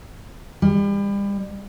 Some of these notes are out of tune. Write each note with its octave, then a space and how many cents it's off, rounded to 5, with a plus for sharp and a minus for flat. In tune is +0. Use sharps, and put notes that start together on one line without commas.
G3 +35